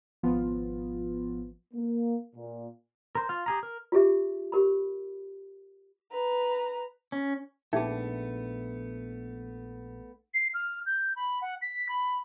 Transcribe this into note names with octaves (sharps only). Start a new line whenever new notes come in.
G#1 F3 B3 F4
A#3
A#2
A#4 C5
F4 F5
G4 G#4 A#5
A#4
F4 G4 G#4 E5
G4 A#4 B5
B4 A#5
C#4
A#1 A3 B3 D#4 G#4 E5 G5 A5
C7
F6
G6
B5
F#5
B6
B5